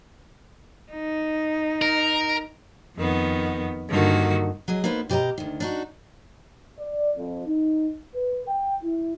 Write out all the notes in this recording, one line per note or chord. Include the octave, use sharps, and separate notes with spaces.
D#4
A#4
F2 D#3 B3
G2 D3 D#3 A#3 F#4
F#3 G#4 D#5
A#3 B3 D#4 B4 C5
B2 G4 C5 D#5 A#5
D2 D#3
D4 D#4 F#4
D5
F2
D#4
B4
G5
E4